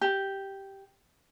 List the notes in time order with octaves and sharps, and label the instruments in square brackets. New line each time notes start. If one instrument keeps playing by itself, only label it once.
[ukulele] G4